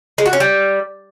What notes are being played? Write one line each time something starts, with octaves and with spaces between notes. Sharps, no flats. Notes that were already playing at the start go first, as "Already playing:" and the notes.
G#3
F#4
C#4
G3